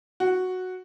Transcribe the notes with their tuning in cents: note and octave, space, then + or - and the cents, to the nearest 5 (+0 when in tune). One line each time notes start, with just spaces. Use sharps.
F#4 -5